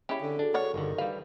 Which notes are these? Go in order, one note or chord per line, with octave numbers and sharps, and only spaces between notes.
C#3 C#4 E4 G4
D3
D4 F#4 G#4 A4
A#4 C#5 D5 F#5
G1 D3 D#3
G3 B4 F5